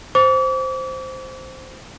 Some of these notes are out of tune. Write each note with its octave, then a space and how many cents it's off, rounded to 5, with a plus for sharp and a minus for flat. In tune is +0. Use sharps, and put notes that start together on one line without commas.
C5 +0 D6 -40